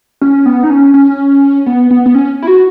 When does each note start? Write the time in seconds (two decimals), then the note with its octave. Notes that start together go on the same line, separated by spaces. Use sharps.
0.21 C#4
0.46 B3
0.63 D#4
0.70 C#4
0.94 C#4
1.66 B3
1.91 B3
2.06 B3
2.15 C#4
2.42 E4
2.47 F#4